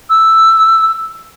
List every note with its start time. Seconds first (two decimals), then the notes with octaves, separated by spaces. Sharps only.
0.10 E6